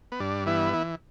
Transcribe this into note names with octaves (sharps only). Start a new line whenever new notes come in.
B3
G2 D4
E3 B3 E4
E3